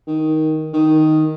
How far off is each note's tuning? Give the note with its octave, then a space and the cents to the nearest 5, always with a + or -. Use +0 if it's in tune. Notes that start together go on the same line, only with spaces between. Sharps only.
D#3 +10
D#3 +0